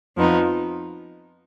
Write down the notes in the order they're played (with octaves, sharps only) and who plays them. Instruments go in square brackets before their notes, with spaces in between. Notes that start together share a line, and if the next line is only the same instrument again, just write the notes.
[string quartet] F2 F3 B3 D#4